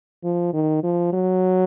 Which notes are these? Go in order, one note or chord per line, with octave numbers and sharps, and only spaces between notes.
F3
D#3
F3
F#3